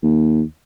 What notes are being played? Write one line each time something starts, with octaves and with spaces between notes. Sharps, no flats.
D#2